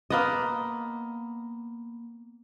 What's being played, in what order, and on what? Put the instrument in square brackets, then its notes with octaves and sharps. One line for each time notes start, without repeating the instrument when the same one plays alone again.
[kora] A#3 B3 D#5